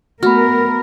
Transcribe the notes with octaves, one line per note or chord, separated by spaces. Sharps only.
A3 B3 F#4 A#4 B5 F6